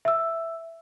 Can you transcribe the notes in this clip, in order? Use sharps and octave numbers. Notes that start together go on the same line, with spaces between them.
E5 E6